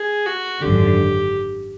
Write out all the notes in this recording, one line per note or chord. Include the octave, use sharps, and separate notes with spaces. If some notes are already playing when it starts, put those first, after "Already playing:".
Already playing: G#4
F#4
G#1 F#2 D3 G4